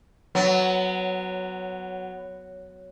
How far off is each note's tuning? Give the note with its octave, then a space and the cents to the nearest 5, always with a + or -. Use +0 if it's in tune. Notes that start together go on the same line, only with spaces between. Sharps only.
F#3 +0 B3 +20